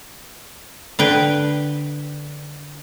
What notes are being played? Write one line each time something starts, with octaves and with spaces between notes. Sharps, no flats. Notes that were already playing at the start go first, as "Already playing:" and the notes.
D3 B4 G5